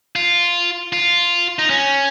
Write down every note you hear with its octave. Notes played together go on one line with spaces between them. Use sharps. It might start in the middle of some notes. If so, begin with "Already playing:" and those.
F4
F4
D#4
C#4